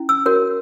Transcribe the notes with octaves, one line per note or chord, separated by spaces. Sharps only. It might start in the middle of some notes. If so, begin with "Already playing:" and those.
Already playing: C#4 E4
E6
F#4 A#4 C#5